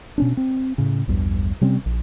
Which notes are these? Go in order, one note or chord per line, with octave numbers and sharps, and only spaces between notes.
B2 C#4 D4
C4
A2 C#3
A#1 E2 G2
C3 G3 C4 C#4
A#1